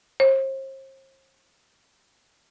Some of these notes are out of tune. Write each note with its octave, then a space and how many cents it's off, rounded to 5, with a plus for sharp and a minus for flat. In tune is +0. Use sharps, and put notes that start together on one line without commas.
C5 +40